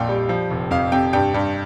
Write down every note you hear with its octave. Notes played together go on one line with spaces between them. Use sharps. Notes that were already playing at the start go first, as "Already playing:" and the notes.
Already playing: A#1 F2 A#2 F5 G5
G3
F3
F1
F2 F5
C3 G5
G2 G5
G2